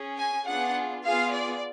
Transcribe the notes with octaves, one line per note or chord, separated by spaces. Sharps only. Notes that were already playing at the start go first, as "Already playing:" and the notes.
Already playing: C#4 G#4
G#5
B3 D4 F4 G#4 F#5
B3 F4 G#4 F5
D5